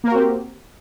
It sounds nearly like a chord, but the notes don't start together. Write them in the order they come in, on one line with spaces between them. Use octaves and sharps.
A#3 A#4 F#4 C4 G4